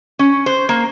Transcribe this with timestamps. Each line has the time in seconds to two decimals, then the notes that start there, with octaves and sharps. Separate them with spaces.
0.19 C#4
0.46 C5
0.69 A#3